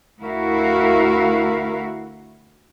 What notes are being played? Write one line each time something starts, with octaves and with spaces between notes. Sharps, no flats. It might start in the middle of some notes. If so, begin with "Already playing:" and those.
D2 E4 F#4 A#4 E5 F5